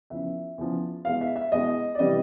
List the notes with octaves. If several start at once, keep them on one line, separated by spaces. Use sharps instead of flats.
E2 C#3 F3 E5
E2 C#3 F3
E2 B2 G#3 F5
E5
E5
E2 B2 G#3 D#5
D5
C3 E3 G3 D#5